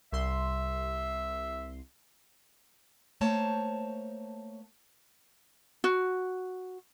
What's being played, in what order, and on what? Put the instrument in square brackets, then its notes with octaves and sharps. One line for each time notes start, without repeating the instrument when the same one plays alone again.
[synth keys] C2 C6 [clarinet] E5
[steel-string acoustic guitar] A3 A#3 C5 C#5 A5
[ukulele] F#4